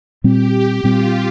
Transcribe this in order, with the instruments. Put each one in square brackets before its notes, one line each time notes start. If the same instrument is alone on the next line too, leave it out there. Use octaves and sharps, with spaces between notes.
[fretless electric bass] A#2 G3 C4 [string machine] G4
[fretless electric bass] A#2 G3 C4 [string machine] F4